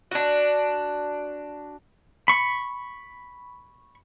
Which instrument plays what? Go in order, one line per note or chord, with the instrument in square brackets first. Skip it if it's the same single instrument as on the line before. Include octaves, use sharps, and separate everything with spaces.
[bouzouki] D4 F#4
[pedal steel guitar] B5 C#6